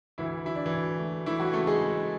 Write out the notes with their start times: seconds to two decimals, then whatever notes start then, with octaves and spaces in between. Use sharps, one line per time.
0.18 D2 E3 E4
0.45 F#3 E4
0.56 D4
0.66 E3 E4
0.72 D2
0.99 A3
1.26 E3 A3 E4
1.40 F#3 F#4
1.53 C#3 A3 A4
1.67 G#3 G#4
1.81 A3